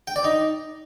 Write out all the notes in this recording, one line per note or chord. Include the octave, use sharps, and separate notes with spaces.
G5
D5
D#4